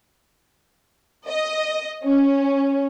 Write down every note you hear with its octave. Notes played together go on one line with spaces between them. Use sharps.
D#5
C#4